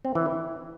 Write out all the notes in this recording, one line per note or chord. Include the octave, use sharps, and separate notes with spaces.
C4
E3
E4